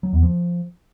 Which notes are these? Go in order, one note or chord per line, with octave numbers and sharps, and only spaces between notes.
F#3
E2
F3